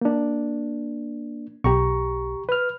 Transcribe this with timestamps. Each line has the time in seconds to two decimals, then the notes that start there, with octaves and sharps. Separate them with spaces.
0.01 A#3 D4
1.64 B1 G4 A#5 C#6
2.49 B4 F6